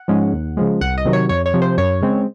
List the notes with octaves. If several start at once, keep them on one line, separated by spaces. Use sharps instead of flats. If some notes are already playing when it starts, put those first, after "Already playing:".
Already playing: F#5
G#2 F3 G#3 C#4
D#2
C#3 F3 G#3
C2 F#5
D#5
C3 D#3 F#3
C#5
F2 C#5
C#5
C3 F3
C5
F#2 C#5
C#3 G#3 C4